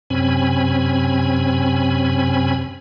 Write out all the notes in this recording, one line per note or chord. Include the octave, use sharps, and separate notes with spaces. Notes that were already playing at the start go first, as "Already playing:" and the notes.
F#2 C3 C4 C#4 G#5 B5